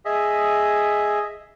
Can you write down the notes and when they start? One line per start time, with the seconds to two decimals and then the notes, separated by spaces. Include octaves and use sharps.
0.05 G#4 D#5 E5